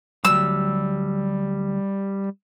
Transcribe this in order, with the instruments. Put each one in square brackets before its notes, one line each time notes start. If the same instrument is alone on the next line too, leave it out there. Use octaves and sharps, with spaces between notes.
[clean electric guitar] D2 F#3 [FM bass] G3 [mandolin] E6